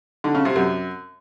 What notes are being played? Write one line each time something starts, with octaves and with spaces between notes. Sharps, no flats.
D3
C#3
C3
F#2